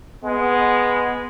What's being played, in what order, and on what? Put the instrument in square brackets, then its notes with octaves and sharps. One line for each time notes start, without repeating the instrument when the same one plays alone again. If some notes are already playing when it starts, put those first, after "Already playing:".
[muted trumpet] G#3 [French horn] B3